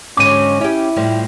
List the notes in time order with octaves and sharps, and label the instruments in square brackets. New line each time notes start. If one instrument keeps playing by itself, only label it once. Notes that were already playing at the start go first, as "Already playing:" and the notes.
[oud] G#2 D3 F#3 [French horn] C#4 [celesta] D6 D#7
[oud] C#4 G4 [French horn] E4
[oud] A2 F3 G3